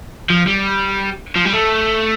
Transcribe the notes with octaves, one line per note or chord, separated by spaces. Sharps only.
F3
G3
F3
G3
A3